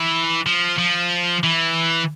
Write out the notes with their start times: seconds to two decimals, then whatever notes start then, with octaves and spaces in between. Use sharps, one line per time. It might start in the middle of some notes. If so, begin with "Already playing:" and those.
Already playing: E3
0.46 F3
0.79 F3
1.44 E3